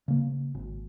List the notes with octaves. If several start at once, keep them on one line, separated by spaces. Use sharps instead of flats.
C#3 A#3
G#1